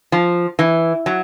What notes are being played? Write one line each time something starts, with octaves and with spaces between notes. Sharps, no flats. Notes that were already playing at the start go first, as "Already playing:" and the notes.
F3
E3
F#3